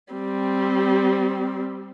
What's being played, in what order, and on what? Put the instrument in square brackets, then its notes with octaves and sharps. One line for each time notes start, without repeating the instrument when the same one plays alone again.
[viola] G3 C4